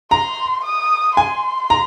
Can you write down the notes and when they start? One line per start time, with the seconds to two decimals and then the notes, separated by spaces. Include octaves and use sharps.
0.11 A#5 C6
0.64 D#6
1.17 G#5 C6
1.70 A#5